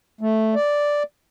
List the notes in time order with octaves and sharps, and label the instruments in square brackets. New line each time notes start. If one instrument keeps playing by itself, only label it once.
[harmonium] A3
D5